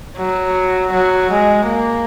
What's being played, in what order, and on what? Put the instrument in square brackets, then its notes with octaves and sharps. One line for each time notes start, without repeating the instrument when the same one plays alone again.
[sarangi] F#3
F#3
G#3
A#3